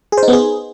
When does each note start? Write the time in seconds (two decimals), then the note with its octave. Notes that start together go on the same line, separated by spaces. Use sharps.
0.12 G#4
0.18 C5
0.23 D#4
0.28 B3
0.33 G#4